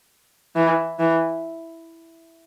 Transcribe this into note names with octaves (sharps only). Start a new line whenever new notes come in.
E3
E3